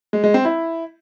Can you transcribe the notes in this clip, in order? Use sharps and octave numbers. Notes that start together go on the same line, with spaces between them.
G#3
G#3
C4
E4